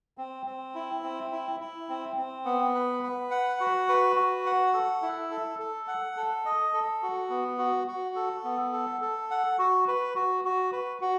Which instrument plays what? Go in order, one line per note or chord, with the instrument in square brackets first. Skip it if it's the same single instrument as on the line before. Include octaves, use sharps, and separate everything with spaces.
[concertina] C4
C4
E4
C4
E4
E4
C4
C4
B3
B4
B4
F#5
F#4
B4
F#4
F#5
A4
E4
A4
A4
F#5
A4
D#5
A4
F#4
B3
F#4
F#4
A4
B3
A4
A4
F#5
F#4
B4
F#4
F#4
B4
F#4